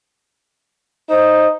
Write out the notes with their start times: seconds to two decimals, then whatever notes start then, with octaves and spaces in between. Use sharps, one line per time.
1.10 D#4 C5